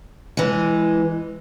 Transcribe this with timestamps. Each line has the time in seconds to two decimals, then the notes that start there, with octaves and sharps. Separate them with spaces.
0.37 E3 G#3